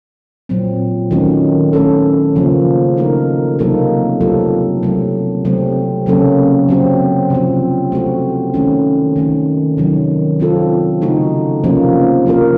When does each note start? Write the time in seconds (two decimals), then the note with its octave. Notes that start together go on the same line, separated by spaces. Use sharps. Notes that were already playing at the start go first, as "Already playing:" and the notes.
0.49 A#2 F#3 C4
1.11 D#3 F#3 A3 C#4 F#4
1.73 A3 C#4 A4
2.35 C#3 F3 A#3
2.97 C#3 A3 D#4 A#4
3.59 C3 F#3 A#3 D#4 A4
4.20 F#3 A3 C4 F4 A4
4.83 C3 F#3 A3
5.45 C3 F#3 A3 C4
6.06 C#3 F#3 A#3 C#4 A4
6.69 F#3 C4 F#4
7.30 C3 F3 C4
7.92 A3 C4 F#4
8.54 D#3 A3 C#4
9.16 D#3 A3 C#4
9.77 C3 D#3 F#3
10.40 F#3 C4 F4 A4
11.01 C#3 A3 D#4 F#4
11.64 C3 F3 A#3 C#4
12.26 F3 A#3 F4 A#4